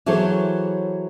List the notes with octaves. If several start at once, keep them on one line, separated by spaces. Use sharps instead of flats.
E3 F#3 G#4 A4 C5 C#5